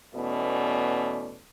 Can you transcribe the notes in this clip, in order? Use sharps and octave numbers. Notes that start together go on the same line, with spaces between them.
E2 B2 A3 C#4 D5